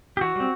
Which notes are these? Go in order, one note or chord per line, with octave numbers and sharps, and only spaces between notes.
G4
E3 F#4
G3 C4